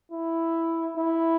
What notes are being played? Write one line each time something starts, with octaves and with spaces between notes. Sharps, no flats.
E4
E4